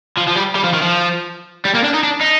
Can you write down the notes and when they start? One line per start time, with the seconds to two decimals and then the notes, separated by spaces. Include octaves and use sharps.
0.18 F3
0.28 F3
0.36 G3
0.55 G3
0.64 F3
0.73 D#3
0.82 F3
1.65 G3
1.75 A#3
1.84 D4
1.94 D#4
2.03 D4
2.21 D#4